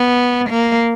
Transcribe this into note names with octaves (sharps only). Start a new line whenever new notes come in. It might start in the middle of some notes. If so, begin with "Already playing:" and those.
Already playing: B3
A#3